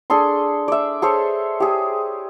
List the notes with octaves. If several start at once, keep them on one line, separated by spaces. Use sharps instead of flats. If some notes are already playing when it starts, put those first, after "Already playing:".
D4 G#4 A4 C6
D5 E5
G#4 A4 C5 C#5
G4 G#4